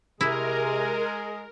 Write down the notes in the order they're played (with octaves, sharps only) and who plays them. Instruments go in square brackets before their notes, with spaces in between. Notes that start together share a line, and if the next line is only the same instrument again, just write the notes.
[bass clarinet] C3 [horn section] G#3 [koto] E4 [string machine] A#4